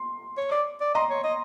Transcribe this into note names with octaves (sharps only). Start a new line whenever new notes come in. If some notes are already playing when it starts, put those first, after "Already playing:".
Already playing: C6
C#5
D5
D5
D#5 A#5 C6
C#5
D#5